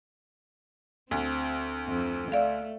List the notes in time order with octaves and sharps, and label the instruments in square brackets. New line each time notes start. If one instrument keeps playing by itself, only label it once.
[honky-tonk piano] D2 [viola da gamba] C4
[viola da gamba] F2
[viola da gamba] A3 [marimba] D5 F5